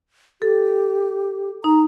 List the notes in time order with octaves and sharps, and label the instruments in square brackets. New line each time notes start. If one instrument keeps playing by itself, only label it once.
[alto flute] G4 [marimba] A4
[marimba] D#4 [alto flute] A#5